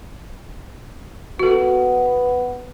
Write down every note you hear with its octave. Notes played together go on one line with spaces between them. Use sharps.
B3 F#4 A4